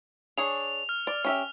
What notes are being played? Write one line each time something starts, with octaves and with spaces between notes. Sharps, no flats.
D4 G#4 C#5 F7
F6
D5
C#4 G4 E5